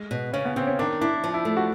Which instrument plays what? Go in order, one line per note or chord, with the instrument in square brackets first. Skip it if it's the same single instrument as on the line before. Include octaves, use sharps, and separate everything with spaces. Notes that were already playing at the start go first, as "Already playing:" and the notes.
Already playing: [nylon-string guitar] G#3
B2
[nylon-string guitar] C#3 [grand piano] C#4
[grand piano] B3
[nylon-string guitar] C#3 [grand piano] C4
[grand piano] C#4
[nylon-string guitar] D#3 [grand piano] D4
[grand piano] D4 [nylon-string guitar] E4
[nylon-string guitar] F3
[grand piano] E4
[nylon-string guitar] A3
[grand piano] F#4